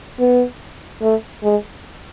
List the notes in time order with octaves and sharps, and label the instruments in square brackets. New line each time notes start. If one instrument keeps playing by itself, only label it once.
[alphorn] B3
A3
G#3